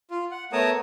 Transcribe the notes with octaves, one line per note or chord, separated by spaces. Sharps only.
F4
F#5
A3 B3 A#4 C#5 A5 D#6